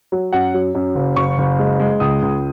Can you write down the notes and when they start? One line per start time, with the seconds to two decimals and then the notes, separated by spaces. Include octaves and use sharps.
0.12 F#3
0.33 F#2 F#5
0.54 F#3
0.75 F#2
0.95 F#1
1.16 F#1 C#6
1.38 F#1
1.59 G#3
1.80 G#3
2.00 C#2 D#6
2.22 C#2